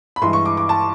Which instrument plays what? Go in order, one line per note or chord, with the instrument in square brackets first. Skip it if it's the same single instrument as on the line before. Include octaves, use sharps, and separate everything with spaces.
[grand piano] B5
G2 E3 G#3 C6
C#6
D6
D6
A5